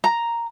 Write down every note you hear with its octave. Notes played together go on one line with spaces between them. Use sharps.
A#5